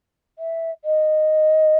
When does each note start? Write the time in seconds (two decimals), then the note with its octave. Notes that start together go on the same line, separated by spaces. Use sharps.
0.39 E5
0.85 D#5